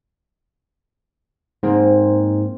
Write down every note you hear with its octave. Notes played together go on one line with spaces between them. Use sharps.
G#2 A#3 C4 A#4